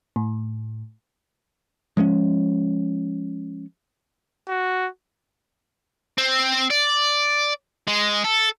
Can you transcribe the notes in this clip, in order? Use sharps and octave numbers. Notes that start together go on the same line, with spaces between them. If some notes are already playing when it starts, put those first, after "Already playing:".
A2
F3 G#3 A3 C#4
F#4
C4
D5
G#3
A4